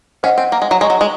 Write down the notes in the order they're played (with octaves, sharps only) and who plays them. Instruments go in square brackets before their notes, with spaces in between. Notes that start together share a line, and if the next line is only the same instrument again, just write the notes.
[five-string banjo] C#4 [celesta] C5 D#5 F#5
[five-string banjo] C4
A#3
G#3
F#3
[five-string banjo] G#3 [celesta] G#4 D#5 A#5 C#6
[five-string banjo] F#3
G#3